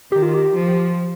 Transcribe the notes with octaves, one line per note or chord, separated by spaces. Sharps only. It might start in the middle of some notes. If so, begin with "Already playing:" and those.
D#3 G4
F4
G4
F3